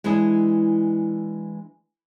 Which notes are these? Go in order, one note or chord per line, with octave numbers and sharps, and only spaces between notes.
E3 G#3 D4 E4 G#4